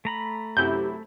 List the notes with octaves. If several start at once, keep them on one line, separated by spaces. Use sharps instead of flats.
A3 A#5 B5
F#2 C3 E4 G4 G6